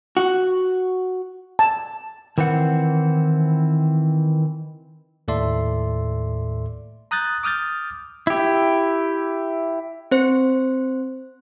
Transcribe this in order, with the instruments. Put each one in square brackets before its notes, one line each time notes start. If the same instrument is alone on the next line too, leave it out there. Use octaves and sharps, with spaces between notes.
[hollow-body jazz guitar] F#4
[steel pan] A5
[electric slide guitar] D#3 E3 C4 F#5
[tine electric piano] D#2 A2 A4 D5 E5 C6
A#5 D#6 F#6 G6 A6
D6 D#6 F6 G6 A6
[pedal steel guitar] E4 G4
[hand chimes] C4 C5